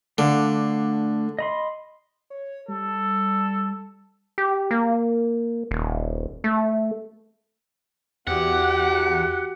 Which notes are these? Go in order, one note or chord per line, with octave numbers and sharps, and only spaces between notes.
D3 A3 D4 F5
D#5 B5 C6
C#5
G3 A4
G4
A#3
D#1
A3
E2 F#4 G4 F#5